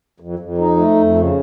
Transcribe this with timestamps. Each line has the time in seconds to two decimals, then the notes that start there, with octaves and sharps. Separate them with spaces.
0.20 F2
0.39 F2
0.58 D#4
0.76 A3
0.95 F2
1.14 C#3